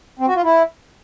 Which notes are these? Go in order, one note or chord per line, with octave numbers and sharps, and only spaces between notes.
C4
F#4
F4
E4